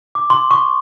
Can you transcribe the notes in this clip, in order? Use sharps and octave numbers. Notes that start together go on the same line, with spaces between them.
D6
C6
C#6